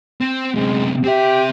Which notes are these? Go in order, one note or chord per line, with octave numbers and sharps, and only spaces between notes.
C4
F#2 C3 G#3
C4 G4 E5